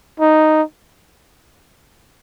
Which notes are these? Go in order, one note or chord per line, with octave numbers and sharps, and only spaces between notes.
D#4